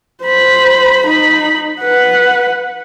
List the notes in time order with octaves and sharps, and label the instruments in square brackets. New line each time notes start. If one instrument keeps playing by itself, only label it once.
[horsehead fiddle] C5 B5
D#4 B5
B4 F#5